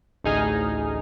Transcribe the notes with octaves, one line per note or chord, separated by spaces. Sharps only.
A1 D2 D#4 G#4 G#5 F6